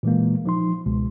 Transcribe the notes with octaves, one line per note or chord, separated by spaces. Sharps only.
A#2 E3 G#3 A#3
F3 D#4 C6
C#2 B2 G#3